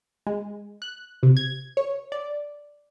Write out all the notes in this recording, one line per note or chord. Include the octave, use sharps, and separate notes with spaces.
G#3
F#6
C3
G#6
C#5
D5